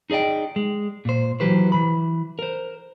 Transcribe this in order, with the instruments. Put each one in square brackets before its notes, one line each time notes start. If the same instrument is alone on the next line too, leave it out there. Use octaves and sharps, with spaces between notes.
[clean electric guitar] D#4 G#4 D5 D#5 G5
G#3
A#2 C5
E3 F#3 G4 B4 C5
E3 B5
A#4 C5